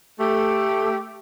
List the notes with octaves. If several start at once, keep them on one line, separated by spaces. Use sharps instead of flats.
A3 G4